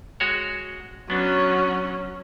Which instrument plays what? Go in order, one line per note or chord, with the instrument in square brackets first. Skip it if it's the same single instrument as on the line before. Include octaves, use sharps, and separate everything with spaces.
[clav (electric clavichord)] G#3 F#4 C#5
[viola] F#3 C#4 [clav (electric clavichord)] B3 D4